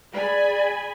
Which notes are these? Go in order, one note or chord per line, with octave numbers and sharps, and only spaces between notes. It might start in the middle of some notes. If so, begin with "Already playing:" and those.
G#4 D5 G#5 B5